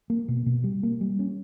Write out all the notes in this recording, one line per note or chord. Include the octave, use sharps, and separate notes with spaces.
A#3
B2
B2
G3
A#3
G3
C#4